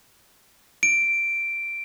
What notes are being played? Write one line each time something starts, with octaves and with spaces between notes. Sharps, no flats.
D7